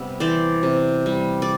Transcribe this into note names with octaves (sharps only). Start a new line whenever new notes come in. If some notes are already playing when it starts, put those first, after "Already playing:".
Already playing: C3 G3 B3 E5
E3 C5 D5
C3
G3
D5